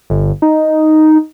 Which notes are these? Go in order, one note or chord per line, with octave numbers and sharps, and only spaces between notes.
G1
D#4